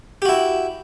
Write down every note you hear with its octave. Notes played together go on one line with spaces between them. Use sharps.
E4 F#4 G4